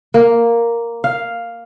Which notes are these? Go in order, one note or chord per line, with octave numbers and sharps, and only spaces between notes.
A#3
F5